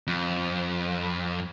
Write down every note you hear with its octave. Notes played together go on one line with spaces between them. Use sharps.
F2